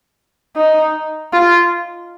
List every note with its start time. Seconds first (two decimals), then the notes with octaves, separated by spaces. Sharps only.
0.56 D#4
1.32 F4